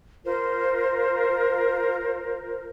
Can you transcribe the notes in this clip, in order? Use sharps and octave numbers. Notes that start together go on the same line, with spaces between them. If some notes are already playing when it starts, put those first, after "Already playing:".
F4 A#4 C5